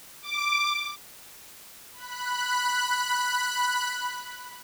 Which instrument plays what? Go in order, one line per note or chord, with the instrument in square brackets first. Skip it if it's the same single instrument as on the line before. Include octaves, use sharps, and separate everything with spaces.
[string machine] D6
[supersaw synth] B5 F#6